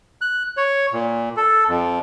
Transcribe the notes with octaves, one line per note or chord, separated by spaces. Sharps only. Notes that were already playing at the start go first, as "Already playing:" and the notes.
F#6
C#5
A#2
A4
F2